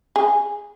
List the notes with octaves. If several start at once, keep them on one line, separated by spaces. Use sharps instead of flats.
G#4